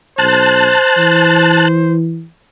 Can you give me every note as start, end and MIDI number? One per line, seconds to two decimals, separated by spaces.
0.18 0.74 35
0.18 1.95 72
0.18 1.68 81
0.18 1.68 90
0.97 2.25 52